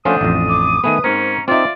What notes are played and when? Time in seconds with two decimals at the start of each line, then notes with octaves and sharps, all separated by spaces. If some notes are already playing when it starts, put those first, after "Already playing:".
0.05 F3 A3 C#4 D4 F4 C5 F#5 D#6
0.21 A1 F2
0.49 D6
0.84 D#3 A3 B3 B4 G#5
1.04 G#2 C4 C#4 A#4 A#5
1.48 C4 D#4 F4 D5 E5 D6